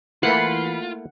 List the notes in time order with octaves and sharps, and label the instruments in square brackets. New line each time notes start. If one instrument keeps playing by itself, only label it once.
[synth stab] E3 B5 C7 [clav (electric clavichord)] A3 A#3 E4 [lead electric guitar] F4 [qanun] F#5